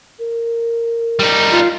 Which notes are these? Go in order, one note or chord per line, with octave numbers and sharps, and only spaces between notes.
A#4
G3 D#4
F4